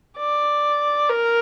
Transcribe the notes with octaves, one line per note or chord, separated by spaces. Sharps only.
D5
A#4